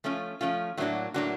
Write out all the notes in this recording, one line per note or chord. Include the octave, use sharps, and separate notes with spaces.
F3 A3 C#4 F4
F3 A3 C#4 F4
A2 F#3 A#3 D4 F#4
A2 F#3 A#3 D4 F#4